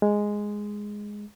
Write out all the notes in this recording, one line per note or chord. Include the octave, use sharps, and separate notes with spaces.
G#3